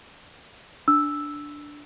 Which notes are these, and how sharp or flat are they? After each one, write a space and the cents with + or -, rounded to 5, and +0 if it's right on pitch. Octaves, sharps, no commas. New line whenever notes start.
D4 +0 E6 +0